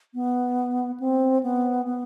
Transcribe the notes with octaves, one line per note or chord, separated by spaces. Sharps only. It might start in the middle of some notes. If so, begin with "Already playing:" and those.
B3
C4
B3
B3